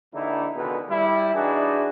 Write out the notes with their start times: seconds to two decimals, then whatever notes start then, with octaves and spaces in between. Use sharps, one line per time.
0.14 A#1 D3 D#4 E4
0.55 C#2 B2 D3 D#3 G#3 B4
0.90 G3 E4
1.34 E3 D4 D#4 F#4 G#4